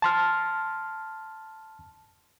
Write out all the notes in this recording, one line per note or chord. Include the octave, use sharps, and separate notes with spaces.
A5 C6 F6